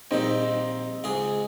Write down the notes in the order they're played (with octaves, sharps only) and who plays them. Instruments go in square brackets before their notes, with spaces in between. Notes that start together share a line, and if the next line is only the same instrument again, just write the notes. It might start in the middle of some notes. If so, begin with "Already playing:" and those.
[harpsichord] A#1 D#3 G3 [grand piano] C4 D#4 D#5
[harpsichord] C#2 G#2 G#4